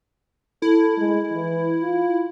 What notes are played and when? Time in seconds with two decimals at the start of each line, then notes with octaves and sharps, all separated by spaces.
0.62 E4 A4
0.98 G#3
1.32 E3
1.80 F4